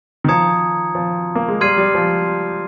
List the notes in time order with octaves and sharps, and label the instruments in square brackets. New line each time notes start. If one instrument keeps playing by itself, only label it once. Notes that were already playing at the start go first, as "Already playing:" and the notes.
[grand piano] D#3
[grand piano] F3 [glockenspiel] A#5 D#6 G#6 C#7
[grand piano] F3
A#3
G#3
[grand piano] G3 [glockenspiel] C6 F6 G#6 C7 D#7
[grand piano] G3
F3